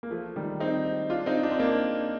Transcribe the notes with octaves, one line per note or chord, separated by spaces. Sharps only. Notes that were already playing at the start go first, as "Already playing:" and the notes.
A#3
F3 A3
D#3 G3
C4 D#4
D4 F4
C4 D#4
D4
C4
A#3 D4